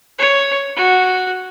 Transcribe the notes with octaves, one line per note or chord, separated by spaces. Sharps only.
C#5
F#4